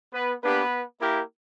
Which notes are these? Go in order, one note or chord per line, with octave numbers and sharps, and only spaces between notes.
B3 B4
A#3 B3 D4 G4 B4
A#3 E4 G4 A#4